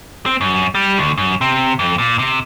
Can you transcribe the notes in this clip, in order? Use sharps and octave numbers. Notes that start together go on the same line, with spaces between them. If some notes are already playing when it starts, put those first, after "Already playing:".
C4
F#2
G3
D2
F#2
C3
F2
A#2
C3